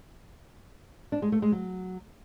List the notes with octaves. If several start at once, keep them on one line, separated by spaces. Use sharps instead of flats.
D4
G#3
A3
G#3
F#3